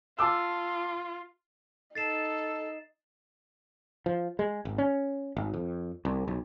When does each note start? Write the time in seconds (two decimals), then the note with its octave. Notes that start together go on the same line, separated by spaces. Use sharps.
0.19 F4 A5 D6 E6
1.95 D#4 A4 A6 C7 E7
4.06 F3
4.39 G#3
4.65 G#1
4.78 C#4
5.37 G#1
5.54 F2
6.05 C2
6.27 B1